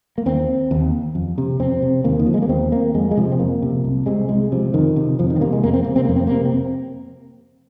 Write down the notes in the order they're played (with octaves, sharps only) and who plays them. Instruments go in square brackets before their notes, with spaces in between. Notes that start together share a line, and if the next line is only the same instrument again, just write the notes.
[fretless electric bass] A#3
D#2 C4
D#2
F2
C3
F2 C4
C3
D#2 A#3
D#3
F3
G#3
A#3
D#2 C4
A#3
F2 G#3
G#3
C3 F3
C4
F2 A#3
C3
C2
C3 G#3
C2 G#3
C3 F3
F2 D#3
C3
F2 F3
D#3
C4
C3 A#3
G#3
F2 A#3
C4
C3 A#3
C4
F2 A#3
C4
C3 A#3
C4